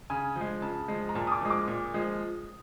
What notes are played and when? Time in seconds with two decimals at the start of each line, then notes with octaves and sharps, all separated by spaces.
0.10 C#3 G#5
0.36 F3
0.41 G#3
0.62 C#3 A5
0.88 F3 G#3
1.09 A#5
1.15 A#2 A5
1.27 D#6
1.32 D6
1.41 F3 G#3
1.50 D6
1.68 A#2
1.94 F3 G#3